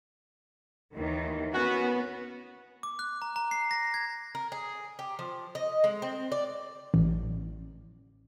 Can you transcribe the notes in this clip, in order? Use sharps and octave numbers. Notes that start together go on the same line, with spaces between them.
D#2 D#3 E3
B3 C#4 F#4
D6
F#6
A#5
A#5
C7
A#6
G#6
A#4
G#4
G4
F3
D#5
G#3
C4
D5
A1